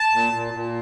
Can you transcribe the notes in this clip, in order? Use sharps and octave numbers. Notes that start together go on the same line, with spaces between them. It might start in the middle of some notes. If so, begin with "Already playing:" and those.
Already playing: A5
A#2
A#2
A#2